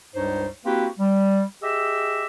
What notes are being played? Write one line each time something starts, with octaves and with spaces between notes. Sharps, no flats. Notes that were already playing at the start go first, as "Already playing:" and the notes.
C#2 G2 G3 D#4 C5 C#5
A#3 C4 E4 F#4 G4 B4
G3
G4 G#4 D#5 E5 E6